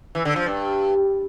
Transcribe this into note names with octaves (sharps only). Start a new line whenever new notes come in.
E3
D3
F3
G2